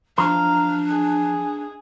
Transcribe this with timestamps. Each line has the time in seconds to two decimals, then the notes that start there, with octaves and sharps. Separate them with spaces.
0.18 F3 D4 F5 A#5
0.89 G#4